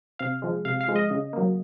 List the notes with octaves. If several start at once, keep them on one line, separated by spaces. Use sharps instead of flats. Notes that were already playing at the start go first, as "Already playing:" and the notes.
C3 F5
F3 G#3
C3 F5
F5
F3 G#3
D#5
C#3
F#3 A#3